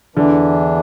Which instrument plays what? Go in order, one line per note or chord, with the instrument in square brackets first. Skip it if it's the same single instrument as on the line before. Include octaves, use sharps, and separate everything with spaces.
[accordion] E2 E3 D4 [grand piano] D3